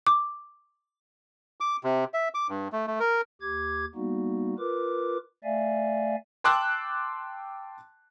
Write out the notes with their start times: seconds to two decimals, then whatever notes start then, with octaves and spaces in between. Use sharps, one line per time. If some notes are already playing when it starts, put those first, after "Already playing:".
0.07 D6
1.60 D6
1.84 C3
2.14 E5
2.35 D6
2.49 G2
2.72 A3
2.87 A3
3.00 A#4
3.41 D#2 G4 D6 G#6
3.95 G3 A#3 B3 D#4 F#4
4.59 F4 A#4 B4 D6
5.44 A3 D5 E5 F5 G#5
6.44 G5 A5 C6 D6 E6 F#6